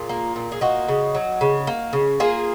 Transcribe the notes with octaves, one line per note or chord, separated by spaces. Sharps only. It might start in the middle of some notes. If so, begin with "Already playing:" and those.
Already playing: A#2 F4 G#4
A#3
A#2
G#4
A#3 D#4 F#4
C#3
F#3
C#3
A#3
C#3
A#3 F4 G#4